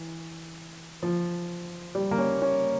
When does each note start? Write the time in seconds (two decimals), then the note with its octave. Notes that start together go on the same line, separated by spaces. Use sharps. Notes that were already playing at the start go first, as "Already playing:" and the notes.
Already playing: E3
1.03 F3
1.95 G3
2.11 A#3
2.18 C#4
2.42 C#4